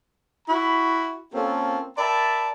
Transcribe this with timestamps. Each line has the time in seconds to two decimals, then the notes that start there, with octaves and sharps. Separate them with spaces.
0.48 E4 F#4 B5
1.34 A#3 C4 C#4 F4 A4
1.98 A#4 D5 E5 G5 A5 B5